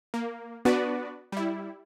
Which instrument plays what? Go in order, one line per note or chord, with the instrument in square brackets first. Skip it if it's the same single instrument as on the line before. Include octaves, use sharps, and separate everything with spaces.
[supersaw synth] A#3
B3 D4 F#4 B4 D5
G3 E4